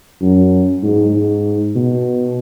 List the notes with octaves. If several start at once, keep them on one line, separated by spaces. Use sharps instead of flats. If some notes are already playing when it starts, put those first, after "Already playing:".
F#2
G#2
G#2
B2